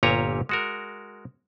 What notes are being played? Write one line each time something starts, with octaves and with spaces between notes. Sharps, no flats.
G1 A#2 G4 C#5 G#5 A#5
G#3 F#4 A#4